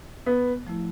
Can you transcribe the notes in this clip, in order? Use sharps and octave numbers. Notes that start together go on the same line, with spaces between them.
B3
F3 A3 E4